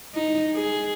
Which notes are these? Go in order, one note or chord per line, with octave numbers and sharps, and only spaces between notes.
D#4
G#4